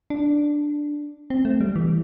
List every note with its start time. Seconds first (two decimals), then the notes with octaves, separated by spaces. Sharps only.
0.10 D4
1.30 C4
1.45 A3
1.61 G3
1.76 E3